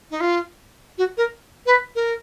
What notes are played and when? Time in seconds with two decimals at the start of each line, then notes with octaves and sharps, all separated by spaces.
0.11 D#4
0.20 F4
0.98 F#4
1.17 A#4
1.66 B4
1.95 A#4